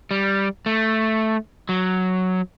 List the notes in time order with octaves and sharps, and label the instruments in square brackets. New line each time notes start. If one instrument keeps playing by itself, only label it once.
[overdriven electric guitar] G3
A3
F#3